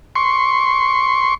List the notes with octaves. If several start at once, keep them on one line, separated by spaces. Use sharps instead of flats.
C6 C#6